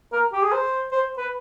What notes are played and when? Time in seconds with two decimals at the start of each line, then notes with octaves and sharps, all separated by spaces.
0.12 A#4
0.32 G4
0.42 G#4
0.52 C5
0.92 C5
1.18 B4